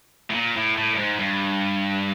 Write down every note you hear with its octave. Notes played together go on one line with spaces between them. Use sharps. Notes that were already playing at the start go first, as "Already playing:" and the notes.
A2
A#2
A2
A2
G2
G#2
G2